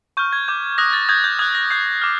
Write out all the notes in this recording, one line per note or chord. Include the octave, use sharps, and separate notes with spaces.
C#6 F6 G6
G#6
D6 G6
D#6 F#6 A#6
A6
D#6 G6 G#6
G6
D#6 F#6 G#6
A#6
D#6 G6 C7
D6 F6